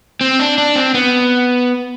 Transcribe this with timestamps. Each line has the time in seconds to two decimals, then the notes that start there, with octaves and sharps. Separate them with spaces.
0.21 C4
0.40 D4
0.58 D4
0.76 C4
0.94 B3